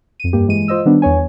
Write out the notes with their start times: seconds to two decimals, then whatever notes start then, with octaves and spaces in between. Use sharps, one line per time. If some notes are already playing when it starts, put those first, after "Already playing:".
0.20 F2 D#7
0.33 G2 A#3 G4
0.48 E3 G#3 D#7
0.68 F4 C5 D#5 E6
0.86 D#3 G3 B3 D4
1.02 E2 B3 C#5 G#5